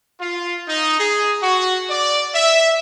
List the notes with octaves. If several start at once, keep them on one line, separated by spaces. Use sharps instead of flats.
F4
D#4
G#4
F#4
D5
E5